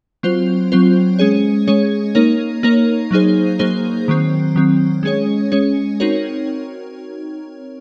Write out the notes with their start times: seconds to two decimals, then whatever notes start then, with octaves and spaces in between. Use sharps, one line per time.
0.23 F#3 C4 F4 C5
0.72 F#3 C4 F4 C5
1.19 G#3 C#4 G#4 C#5
1.67 G#3 C#4 G#4 C#5
2.15 A#3 D#4 A#4 C#5
2.63 A#3 D#4 A#4 C#5
3.11 F#3 A#3 D#4 G#4 C5
3.59 F#3 A#3 D#4 G#4 C5
4.08 D#3 F#3 C4
4.56 D#3 F#3 C4
5.03 G#3 C#4 G#4 C#5
5.52 G#3 C#4 G#4 C#5
6.00 C4 D#4 F#4 A#4 C#5